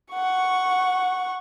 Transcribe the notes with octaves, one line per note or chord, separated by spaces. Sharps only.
F#5 C#6